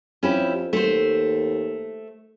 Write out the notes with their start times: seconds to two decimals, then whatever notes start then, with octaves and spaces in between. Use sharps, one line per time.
0.23 F2 C#4 E4 G4
0.73 D#2 A3 C5